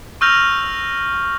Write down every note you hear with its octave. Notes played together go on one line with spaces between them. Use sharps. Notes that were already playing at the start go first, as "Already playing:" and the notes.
C#6 E6 F6 G6 A#6 F7